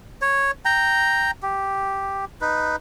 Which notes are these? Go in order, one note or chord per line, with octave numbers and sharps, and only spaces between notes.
C#5
G5 A#5
G4
D#4 B4